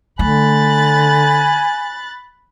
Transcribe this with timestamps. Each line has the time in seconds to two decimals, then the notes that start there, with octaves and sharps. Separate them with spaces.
0.19 D3 A3 G#5 B5 F#6 A6